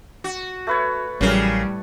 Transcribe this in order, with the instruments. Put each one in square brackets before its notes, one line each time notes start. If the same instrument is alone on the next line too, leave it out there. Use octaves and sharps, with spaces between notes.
[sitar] F#4
[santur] A3 B4 C#5
[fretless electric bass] A1 F#3 [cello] A2 G3 [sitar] C#3 G#4 A#4